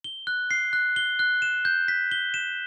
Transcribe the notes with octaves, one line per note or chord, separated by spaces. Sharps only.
G7
F#6
C7
F#6
G7
F#6
E7
G6
B6
G7
E7